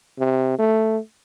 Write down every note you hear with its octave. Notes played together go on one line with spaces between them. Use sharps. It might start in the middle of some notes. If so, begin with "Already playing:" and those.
C3
A3